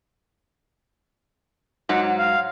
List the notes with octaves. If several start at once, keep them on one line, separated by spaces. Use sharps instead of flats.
G#2 F#3 F#5
F5